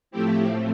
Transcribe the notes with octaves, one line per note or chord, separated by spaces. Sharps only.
A2 F3 A3 C4 E4 G4